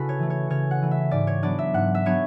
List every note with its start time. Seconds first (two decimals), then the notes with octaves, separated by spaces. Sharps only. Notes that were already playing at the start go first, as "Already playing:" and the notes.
Already playing: C#3 E4 F#4 A4 B4
0.09 C#5
0.19 E3 A3
0.30 C#5
0.50 C#3 C#5
0.71 F#5
0.82 E3 A3
0.91 E5
1.11 G#2 D5
1.27 C#5
1.43 F#3 B3 D4 D5
1.59 E5
1.74 G#2 F#5
1.95 E5
2.05 F#3 B3 D4 C#5